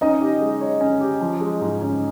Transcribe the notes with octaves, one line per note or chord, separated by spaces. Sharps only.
C#4 D#4 D#5
G4
G#3
C#5
C#4
G4
F3
G#3
G#2
C#4